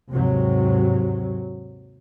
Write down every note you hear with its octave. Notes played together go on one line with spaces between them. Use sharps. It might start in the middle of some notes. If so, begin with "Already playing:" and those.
D#2 G#2 C3 F#3